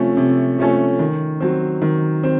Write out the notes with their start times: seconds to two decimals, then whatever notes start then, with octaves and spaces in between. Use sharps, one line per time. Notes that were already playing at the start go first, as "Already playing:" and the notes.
Already playing: C3 F3 A3 C#4 A4
0.17 C3
0.58 F3 A3 C#4 A4
0.99 D#3
1.40 F#3 C4
1.82 D#3
2.24 C4